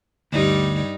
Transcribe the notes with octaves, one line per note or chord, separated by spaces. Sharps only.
D2 G2 G3 D#4